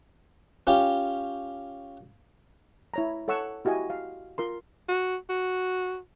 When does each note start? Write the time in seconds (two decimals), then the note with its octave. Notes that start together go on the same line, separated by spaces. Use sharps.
0.67 C#4 F4 G4
2.94 E4 C#5 A#5
3.28 A4 C#5 F#5 C#6 E6
3.65 E4 F#4 G4 D#5 G#5
3.90 F5
4.38 F4 A#4 C6
4.89 F#4
5.29 F#4